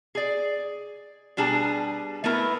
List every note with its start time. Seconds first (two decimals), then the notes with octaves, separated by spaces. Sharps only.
0.15 G#4 D5
1.37 B2 G3 D4 G#4 A5 A#5
2.24 A3 B3 E4 A#4 B4